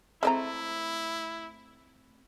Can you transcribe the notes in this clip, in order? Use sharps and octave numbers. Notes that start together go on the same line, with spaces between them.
G#3 A3 C4 E4 D5 E5 A#5